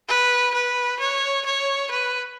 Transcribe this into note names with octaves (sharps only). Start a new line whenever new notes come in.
B4
B4
C#5
C#5
B4